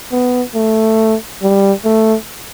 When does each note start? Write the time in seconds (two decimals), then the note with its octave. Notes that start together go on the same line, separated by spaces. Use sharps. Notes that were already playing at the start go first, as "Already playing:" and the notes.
0.12 B3
0.54 A3
1.42 G3
1.85 A3